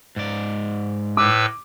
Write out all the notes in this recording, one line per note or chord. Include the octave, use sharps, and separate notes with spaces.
G#2 D5
A2 B4 D6 E6